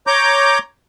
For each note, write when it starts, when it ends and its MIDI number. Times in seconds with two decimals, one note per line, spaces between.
0.07 0.59 73
0.07 0.59 82
0.07 0.59 86
0.07 0.59 91